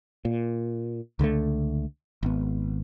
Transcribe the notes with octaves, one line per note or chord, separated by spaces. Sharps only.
A#2
C#2 D3 G3 A3
G#1 B3